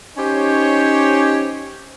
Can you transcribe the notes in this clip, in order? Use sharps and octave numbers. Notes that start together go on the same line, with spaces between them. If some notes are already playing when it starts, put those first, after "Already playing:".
C#4 D#4 G4 C5 C#5